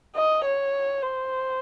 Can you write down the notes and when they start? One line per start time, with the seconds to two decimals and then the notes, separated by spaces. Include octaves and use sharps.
0.16 D#5
0.45 C#5
1.02 C5